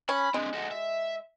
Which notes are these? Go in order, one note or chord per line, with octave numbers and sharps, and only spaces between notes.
C#4 B5
G#3 C4 D4
F#4 A4
E5